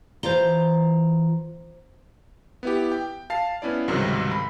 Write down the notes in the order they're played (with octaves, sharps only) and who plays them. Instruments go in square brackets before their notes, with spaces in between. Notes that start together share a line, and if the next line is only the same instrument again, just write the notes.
[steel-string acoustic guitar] E3 F4 A#5 [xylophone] C5 G7
[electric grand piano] B3 E4 G4
G5
F5 A5 C7
B3 C#4 E4 D5
C#2 G#2 C3 D#3 F#3 G3
B5